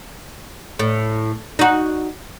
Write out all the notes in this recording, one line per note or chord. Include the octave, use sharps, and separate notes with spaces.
A2
D#4 F#4